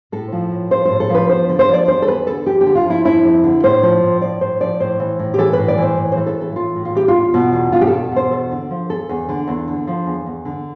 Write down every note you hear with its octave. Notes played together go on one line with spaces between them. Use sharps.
A2 A4
F3
A2
F3 C5
A2 C5
A4
F3
B4
E2 C5
D3
C5
F3
D5
E2 C5
A4
E2 B4
D3 A4
F2 G4
G4
D3
F4
F3 E4
F2 E4
F2
D3
A2 C5
F3
A2
F3 D5
A2 C5
F3 D5
A2 C5
E3
A2
G4
E3 A4
A2 B4
D5
E3 C5
A2
C5
E3
A4
A2
A4
E3 F4
A2
F4
E3 G4
F4
E2
B2
E2
B2 F4
G4
E2 A4
B2 C5
E2 A4
D3
F3
E2 A4
E2
D3
E2
D3
F3
E2
E2
D3